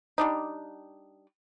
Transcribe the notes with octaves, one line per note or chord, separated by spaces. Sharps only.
G3 D4 D#4